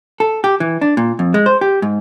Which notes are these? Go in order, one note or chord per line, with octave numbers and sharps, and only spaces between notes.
A4
G4
E3
D4
A#2
F2
G#3
C5
G4
G#2